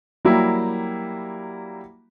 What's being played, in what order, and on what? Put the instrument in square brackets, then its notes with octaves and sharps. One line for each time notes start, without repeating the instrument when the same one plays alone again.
[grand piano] F#3 G3 A#3 E4 G4